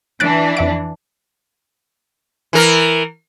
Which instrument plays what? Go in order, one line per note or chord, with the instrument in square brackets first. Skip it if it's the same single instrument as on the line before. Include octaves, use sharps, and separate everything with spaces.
[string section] E3 D4 [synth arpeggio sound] F#6 A6 D7
[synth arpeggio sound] F2 E5 D7
[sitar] E3 A#4